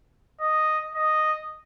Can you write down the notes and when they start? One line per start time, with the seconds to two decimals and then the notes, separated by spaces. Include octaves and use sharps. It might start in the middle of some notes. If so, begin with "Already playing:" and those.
0.41 D#5
0.95 D#5